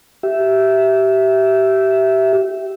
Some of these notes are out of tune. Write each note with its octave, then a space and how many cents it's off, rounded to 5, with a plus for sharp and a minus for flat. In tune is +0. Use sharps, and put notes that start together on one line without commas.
G4 -25 E5 +0